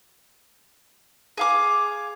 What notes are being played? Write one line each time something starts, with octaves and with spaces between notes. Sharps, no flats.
G#4 F5 D6